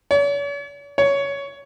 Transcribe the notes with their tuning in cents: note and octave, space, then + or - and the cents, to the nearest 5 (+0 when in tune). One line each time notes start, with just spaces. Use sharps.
C#5 +45
C#5 +15